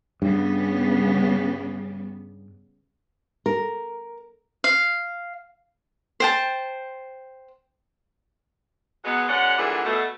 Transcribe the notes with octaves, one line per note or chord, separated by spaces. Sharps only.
G2 C#3 G3 B3
A#4
F5
C5 G5 A5
F#3 G#3 B3
F#2 G#3 C#4 D5 F#5
A#2 D3 E3 F#3 G3 G#4
B2 A3